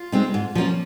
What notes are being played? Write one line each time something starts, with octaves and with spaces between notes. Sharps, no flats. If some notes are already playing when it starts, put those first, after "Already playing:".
Already playing: F4
G#3 C4 D#4
G#2
F3 A#3 C#4